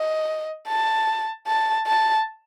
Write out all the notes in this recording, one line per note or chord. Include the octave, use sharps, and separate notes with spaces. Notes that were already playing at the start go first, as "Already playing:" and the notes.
Already playing: D#5
A5
A5
A5